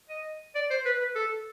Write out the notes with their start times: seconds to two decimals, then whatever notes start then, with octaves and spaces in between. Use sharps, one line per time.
0.09 D#5
0.55 D5
0.70 C5
0.85 B4
1.00 B4
1.15 A4